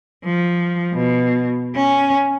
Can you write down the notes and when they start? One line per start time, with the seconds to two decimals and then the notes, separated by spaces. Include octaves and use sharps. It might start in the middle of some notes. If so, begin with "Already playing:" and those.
0.24 F3
0.93 B2
1.75 C#4